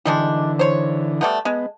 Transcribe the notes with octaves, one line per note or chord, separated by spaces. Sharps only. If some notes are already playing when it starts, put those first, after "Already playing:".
D3 E3 G3 G#3 D4
C5 C#5
G3 A3 B3
G#3 B3